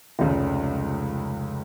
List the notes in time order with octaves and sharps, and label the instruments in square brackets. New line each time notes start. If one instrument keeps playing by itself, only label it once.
[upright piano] F1 C#2 C#3